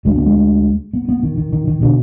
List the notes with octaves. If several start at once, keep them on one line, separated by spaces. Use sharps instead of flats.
D2 D3 G#3
B3
G#3
B3
B3
D#3
D#3
D#3
D#3
B2 D3